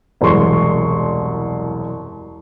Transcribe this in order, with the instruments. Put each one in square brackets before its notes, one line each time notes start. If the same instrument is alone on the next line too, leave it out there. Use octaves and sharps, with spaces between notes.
[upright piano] E1 C2 F#2 G#3 C6 C#6